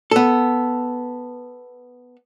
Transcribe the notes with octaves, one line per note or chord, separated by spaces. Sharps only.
B3 A4